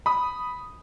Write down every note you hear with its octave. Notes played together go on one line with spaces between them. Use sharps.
B5 D#6